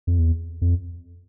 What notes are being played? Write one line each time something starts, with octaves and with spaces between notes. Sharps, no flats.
F2
E2
F2